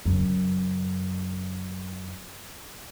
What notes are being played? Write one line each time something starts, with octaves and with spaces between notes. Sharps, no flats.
F#2 C#3